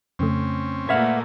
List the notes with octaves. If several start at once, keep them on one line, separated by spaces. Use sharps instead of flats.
F2 C#3 A3 C4 C#4
A#2 A3 A#3 B4 E5 F#5 F6 G#6